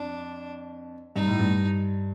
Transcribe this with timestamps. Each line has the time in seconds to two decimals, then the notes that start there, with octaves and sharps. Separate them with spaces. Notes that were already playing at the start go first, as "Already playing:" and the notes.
Already playing: F2 D4
1.16 G2 D#4
1.27 A2
1.39 G2